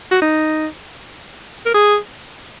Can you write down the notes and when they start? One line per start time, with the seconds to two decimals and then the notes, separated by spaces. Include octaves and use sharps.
0.11 F#4
0.22 D#4
1.66 A#4
1.74 G#4